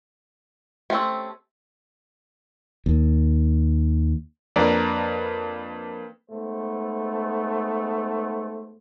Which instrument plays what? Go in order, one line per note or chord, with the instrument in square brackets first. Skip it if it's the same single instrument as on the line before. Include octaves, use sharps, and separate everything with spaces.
[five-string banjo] A3 C4 C#4 [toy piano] G4 C6 E6
[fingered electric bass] D#2
[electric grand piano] F2 A#3 D4 B4 D5 A#5
[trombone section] G#2 A3 B3 C5